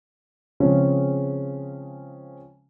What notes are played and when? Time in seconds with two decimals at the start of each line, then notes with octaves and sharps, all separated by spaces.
0.60 C#3 F3 G#3 C4 C#4